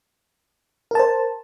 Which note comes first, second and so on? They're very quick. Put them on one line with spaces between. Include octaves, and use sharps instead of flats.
A#4 A5 C5